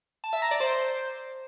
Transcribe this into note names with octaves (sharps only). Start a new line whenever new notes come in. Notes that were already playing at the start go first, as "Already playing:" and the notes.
A5
E5
A#5
D5
C5